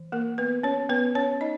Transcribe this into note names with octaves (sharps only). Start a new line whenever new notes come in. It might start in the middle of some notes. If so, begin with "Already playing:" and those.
Already playing: E3
A#3 A#4
B3 B4
C#4 C#5
B3 B4
C#4 C#5
D#4 D#5